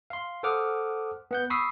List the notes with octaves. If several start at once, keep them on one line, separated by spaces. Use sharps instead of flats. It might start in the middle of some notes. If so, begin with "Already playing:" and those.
F5 C6
A4 C5 F#5 D6 D#6 F6
B3 F#5 G6
B5 C#6 D#6 E6 B6 C7